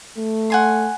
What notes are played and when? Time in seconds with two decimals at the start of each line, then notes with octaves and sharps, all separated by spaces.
0.17 A3
0.50 F#5 G#5 C6